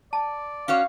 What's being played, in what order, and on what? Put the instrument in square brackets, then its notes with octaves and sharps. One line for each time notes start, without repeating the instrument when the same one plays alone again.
[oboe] D5 [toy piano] A5
[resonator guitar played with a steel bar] C#4 F#4 C#5 [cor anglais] F5